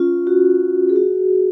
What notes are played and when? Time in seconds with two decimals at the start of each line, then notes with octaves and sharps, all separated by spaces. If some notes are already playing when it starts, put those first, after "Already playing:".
Already playing: C#4 F4
0.27 F#4
0.89 G#4
0.96 F#4